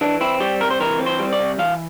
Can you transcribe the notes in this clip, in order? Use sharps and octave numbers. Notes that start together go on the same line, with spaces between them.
E3 D4
C4 E4
G3 G4
C3 A#4
C5
E3 A#4
C4
C5
G3
D5
C3
E3 F5